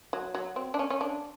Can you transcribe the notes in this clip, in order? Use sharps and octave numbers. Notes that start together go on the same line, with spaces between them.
F#3
F#3
C4
D4
C#4
C#4
D4